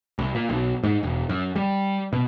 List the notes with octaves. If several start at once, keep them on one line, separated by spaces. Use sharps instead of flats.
C2
A#2
B1
G#2
E1
F#2
G3
B2